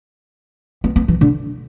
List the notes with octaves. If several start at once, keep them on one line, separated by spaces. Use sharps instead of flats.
B3
B3
E3
D3